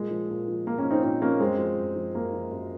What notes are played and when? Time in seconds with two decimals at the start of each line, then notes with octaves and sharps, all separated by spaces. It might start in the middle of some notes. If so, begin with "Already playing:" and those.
Already playing: A#2 G#3
0.11 F3
0.30 A#2
0.48 F3
0.66 A#2 A#3
0.78 A#3 C#4
0.84 F3
0.91 C4 D#4
1.03 A#2 C4 D#4
1.21 F3 A#3 C#4
1.40 F#2 G#3 C4
1.58 F3
1.78 F#2
1.96 F3
2.14 F#2 A#3
2.33 F3
2.51 F#2